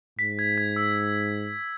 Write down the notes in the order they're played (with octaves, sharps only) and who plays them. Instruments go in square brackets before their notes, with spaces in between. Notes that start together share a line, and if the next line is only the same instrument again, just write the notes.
[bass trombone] G#2 [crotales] B6
[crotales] G#6
G#6
E6